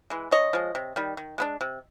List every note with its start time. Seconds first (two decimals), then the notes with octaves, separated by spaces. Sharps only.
0.10 E3 G#3
0.31 D3 C#5 D#5
0.53 F3 G#3
0.75 C3
0.96 D#3 G3
1.17 D#3
1.38 G#3 B3 D4
1.61 C3